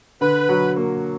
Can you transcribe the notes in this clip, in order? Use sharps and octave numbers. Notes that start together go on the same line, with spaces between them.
D3 B4
F#3
A#3